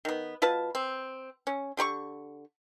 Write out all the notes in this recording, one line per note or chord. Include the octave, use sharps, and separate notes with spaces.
D#3 B3
B2 F4 B4 A5
C4
C#4
D3 G4 B5 C#6